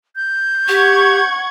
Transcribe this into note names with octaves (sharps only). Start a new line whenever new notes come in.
G6
G4 F#5 C#6 G#6